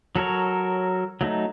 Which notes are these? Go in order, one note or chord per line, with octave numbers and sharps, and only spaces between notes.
F#3 A4 A#4 C#5
F#3 A3 D#4